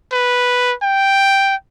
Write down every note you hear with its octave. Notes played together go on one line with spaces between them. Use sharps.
B4
G5